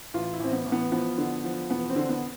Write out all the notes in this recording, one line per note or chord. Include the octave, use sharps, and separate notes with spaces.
A1 F4
E4
A1 C4
B3
A1
B3
F3 B3
D3
F3
E1 B3
C4
D3
B3